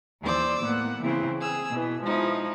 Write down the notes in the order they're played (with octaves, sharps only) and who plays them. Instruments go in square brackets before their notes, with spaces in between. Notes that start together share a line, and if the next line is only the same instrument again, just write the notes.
[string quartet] D#2 E3 C5 D5 D6 E6
A2 A#3 B3 F#5
C#3 E3 C4 E4 C5
G#4 E6
B2 E3
F3 G#3 D#4 E4